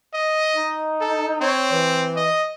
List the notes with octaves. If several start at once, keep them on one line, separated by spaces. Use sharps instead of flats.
D#5
D#4
A4
C4 C#5
E3
D#5